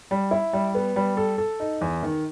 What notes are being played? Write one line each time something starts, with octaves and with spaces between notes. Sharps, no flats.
G3
E4
G3
B3
G3
A4
A4
D#4
E2
D#3